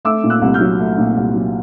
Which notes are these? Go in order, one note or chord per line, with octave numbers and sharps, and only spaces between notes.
A3 D6 E6
A#2
E6 F#6
C2
F6 G6
F#3
A3
A#2
C2
F#3